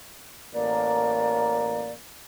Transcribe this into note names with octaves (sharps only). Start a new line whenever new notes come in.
A1 A#3 A#4 D5